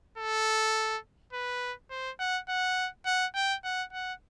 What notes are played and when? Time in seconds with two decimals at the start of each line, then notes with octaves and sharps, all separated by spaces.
0.18 A4
1.33 B4
1.91 C5
2.20 F#5
2.49 F#5
3.06 F#5
3.35 G5
3.64 F#5
3.93 F#5